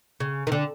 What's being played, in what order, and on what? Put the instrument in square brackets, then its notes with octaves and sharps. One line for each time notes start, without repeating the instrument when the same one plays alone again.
[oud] C#3
D#3
D3